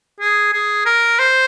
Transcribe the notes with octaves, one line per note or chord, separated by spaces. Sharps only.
G#4
G#4
A#4
C5